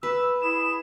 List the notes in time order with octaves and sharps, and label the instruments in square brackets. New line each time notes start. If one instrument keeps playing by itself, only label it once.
[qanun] B4 [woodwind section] E6
[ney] E4 [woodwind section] G#4 B5 [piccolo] E7